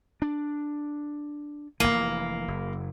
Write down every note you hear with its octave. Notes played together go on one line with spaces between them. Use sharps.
D4
F1 A#1 E3 A#3
F#1